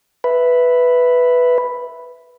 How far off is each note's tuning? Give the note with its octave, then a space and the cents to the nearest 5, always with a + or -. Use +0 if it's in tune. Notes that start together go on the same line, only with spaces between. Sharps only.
B4 +0 E5 +0